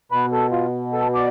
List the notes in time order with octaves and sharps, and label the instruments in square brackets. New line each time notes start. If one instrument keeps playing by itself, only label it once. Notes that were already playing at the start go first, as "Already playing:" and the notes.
[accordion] B2 B4
A4
F4
A4
D5